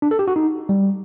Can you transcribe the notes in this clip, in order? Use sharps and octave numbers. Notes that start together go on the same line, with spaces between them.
D4
A4
G4
F#4
D#4
G3